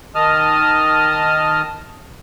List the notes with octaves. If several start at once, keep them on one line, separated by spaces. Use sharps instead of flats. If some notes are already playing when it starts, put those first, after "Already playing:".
D#3 D#5 A5 D#6 F6